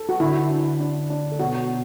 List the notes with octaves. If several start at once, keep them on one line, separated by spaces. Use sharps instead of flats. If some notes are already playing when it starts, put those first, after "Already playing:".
Already playing: A4
F#4
D3 E4
D4
D4
D4
A4
B2 F#4